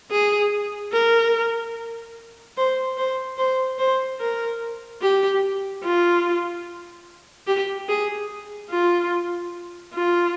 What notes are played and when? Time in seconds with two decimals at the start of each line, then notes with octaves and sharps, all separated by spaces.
0.11 G#4
0.93 A#4
2.57 C5
2.97 C5
3.38 C5
3.78 C5
4.20 A#4
5.02 G4
5.84 F4
7.47 G4
7.88 G#4
8.70 F4
9.93 F4